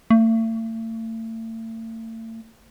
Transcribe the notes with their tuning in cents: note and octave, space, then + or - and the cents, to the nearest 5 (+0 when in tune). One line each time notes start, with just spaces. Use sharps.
A3 +40